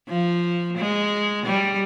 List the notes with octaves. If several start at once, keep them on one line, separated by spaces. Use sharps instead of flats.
F3
G#3
G3